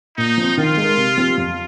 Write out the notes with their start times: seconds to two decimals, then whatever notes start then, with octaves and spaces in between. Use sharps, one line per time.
0.17 A#2 D#4
0.38 F3 C4
0.57 D#3 F4
0.77 G#3 D#4 A#4
0.97 C3
1.17 F3 C4 G4
1.37 F2 F4